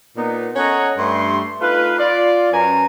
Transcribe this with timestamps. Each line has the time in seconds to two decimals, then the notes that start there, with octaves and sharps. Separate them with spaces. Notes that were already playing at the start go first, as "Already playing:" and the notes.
0.16 A#2 B3 D#4
0.56 C#4 A4 C#5 D#5 F#5 A#5
0.97 G2 A3 C6
1.60 A3 D#4 F4 B4
1.98 F4 D5
2.52 F#2 C#4 B4 G#5 A#5